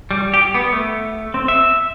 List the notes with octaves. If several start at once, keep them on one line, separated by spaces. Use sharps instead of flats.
G3
G4
B3
A3
C4
E5